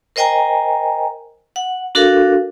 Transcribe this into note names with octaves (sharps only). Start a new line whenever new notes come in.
A#4 C5 D#5 G5 G#5 A#5
F#5
D4 F#4 A4 A#4 F5